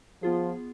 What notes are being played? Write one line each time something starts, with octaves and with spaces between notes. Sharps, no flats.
F3 B3 F4 G#4